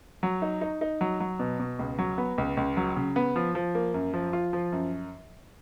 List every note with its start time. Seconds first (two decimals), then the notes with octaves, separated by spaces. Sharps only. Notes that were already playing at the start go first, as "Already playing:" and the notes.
0.23 F#3
0.42 D#4
0.61 D#4
0.81 D#4
1.01 F#3
1.20 F#3
1.39 B2
1.60 B2
1.79 C#2
1.99 F#3
2.18 B3
2.38 C#2
2.57 C#2
2.77 F#3
2.96 C#3
3.16 B3
3.36 F3
3.55 F3
3.75 A#3
3.94 F#2
4.14 F3
4.33 F4
4.53 F3
4.72 F#2